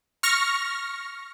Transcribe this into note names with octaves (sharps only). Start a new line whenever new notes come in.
C#6 F6 A#6